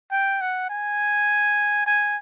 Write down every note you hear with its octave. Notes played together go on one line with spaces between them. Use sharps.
G5
F#5
G#5
G#5